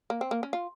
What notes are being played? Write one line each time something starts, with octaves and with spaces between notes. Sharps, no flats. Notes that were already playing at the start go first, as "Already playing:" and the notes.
A#3
C4
A#3
C#4
F4